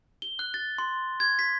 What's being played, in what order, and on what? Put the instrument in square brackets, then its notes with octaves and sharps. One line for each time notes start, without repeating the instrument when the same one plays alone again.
[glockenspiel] G7
F#6
A6
C6
G#6
B6